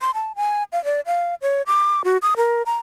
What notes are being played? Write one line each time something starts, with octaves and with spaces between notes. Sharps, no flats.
C6
A5
G#5
F5
D5
F5
C#5
D6
F#4
D#6
A#4
A#5